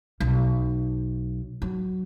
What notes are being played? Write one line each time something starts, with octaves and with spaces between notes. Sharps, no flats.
B1
F#3